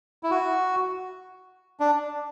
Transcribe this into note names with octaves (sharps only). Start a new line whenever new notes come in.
E4
F#4
D4